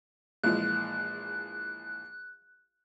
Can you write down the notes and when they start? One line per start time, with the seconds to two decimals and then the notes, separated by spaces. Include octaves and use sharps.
0.44 A#1 E3 G#3 F#6